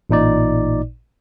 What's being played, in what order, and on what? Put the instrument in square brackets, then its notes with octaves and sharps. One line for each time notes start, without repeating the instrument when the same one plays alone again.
[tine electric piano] A1 A#2 D#4 D5